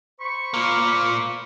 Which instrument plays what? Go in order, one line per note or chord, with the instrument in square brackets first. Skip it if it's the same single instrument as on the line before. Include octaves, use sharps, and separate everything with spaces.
[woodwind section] C5 B5 C#6
[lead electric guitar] A#3 F4